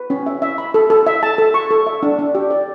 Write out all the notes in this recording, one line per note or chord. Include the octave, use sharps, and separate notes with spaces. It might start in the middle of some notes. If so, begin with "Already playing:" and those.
Already playing: B4
C#4
E5
E5
B5
A4
A4
E5
A5
A4
C#6
A4
E5
D4
D4
G4
D5